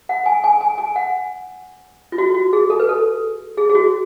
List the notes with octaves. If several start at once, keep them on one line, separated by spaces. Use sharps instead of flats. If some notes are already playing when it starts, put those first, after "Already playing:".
F#5
G#5
G#5
G#5
G#5
F#5
F4
F#4
F#4
G#4
A4
B4
A4
G#4
G#4
F#4